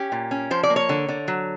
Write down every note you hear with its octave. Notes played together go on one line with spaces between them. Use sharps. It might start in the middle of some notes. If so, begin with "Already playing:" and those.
Already playing: C#4 G4
A#2
C#4
F3 C5
D5
A#3
C#5
D3
D3
F#3